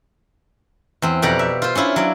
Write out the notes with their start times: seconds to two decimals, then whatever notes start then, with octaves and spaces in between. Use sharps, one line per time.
1.02 E2 C4
1.22 F2 B2 G4 D5 F#5 A#5
1.39 E5
1.62 F4 C5
1.75 C#4 D4 E4 F4
1.96 F#3 D5